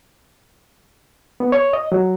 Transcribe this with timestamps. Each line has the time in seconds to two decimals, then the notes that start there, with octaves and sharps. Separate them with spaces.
1.40 B3
1.52 C#5
1.73 D#5
1.92 F#3